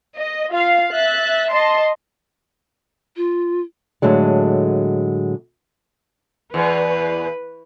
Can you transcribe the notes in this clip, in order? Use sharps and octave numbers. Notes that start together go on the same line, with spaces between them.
D#5
F4 F5
E5 F#6 A6
D#5 A5 C6
F4
A2 D3 F#3 G#3
E2 B4